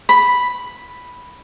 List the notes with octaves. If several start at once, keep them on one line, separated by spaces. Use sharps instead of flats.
B5